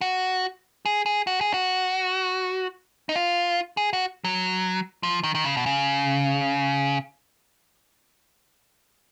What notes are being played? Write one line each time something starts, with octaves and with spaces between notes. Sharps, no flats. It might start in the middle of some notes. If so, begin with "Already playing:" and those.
F#4
G#4
G#4
F#4
G#4
F#4
D#4
F4
G#4
F#4
F#3
F3
D#3
D#3
C#3
B2
C#3